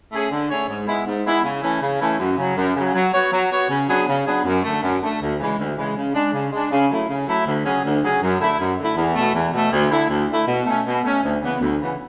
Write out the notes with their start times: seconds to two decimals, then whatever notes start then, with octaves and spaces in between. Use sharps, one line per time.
0.12 A3 C#4 G#4 C#5
0.31 D3
0.50 A3 C#4 G#4 C#5
0.69 G#2
0.87 G#3 B3 E4
1.06 G#2
1.25 G#3 B3 E4
1.44 C#3
1.62 E3 A3 C#4 E4
1.81 C#3
2.00 E3 A3 C#4 E4
2.19 F#2
2.38 C#3 F#3
2.57 F#2
2.75 C#3 F#3
2.94 F#3
3.14 B3 F#4 C#5
3.32 F#3
3.51 B3 F#4 C#5
3.69 C#3
3.89 F#3 B3 D4 G#4
4.08 C#3
4.26 F#3 B3 D4 G#4
4.44 F#2
4.63 D3 A3
4.82 F#2
5.02 D3 A3
5.21 D2
5.39 C#3 E3 G#3
5.58 D2
5.77 C#3 E3 G#3
5.96 C#3
6.15 G#3 D4
6.33 C#3
6.52 G#3 D4
6.71 C#3
6.90 F#3 A3 E4
7.08 C#3
7.27 F#3 A3 E4
7.46 D2
7.65 C#3 F#3 C#4 G#4
7.84 D2
8.02 C#3 F#3 C#4 G#4
8.22 F#2
8.40 D3 A3 E4
8.59 F#2
8.78 D3 A3 E4
8.97 E2
9.16 B2 A3
9.35 E2
9.53 B2 A3
9.72 D2
9.91 D3 A3 E4
10.09 D2
10.29 D3 A3 E4
10.47 B2
10.66 A3 C#4
10.86 B2
11.04 A3 C#4
11.23 D2
11.41 C#3 E3 B3
11.60 D2
11.79 C#3 E3 B3